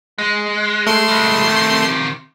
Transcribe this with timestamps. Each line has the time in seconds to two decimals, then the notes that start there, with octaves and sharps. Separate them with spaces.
0.18 G#3
0.86 A3 C6
1.08 G3 G#3
1.44 C3 D#3